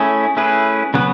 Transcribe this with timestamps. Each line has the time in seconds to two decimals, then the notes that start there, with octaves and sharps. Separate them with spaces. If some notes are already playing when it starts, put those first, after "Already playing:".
Already playing: A3 C#4 E4 G#4
0.37 A3 C#4 E4 G#4 B4
0.94 C#3 F#3 B3 F#4 B4